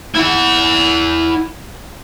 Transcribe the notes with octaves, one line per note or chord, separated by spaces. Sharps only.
E4 F#5